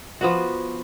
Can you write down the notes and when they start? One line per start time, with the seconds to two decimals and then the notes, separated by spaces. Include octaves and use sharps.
0.21 F3 B3 F#4